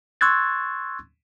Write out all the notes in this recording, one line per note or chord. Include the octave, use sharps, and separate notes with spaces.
C6 C#6 E6 F#6 G#6 A6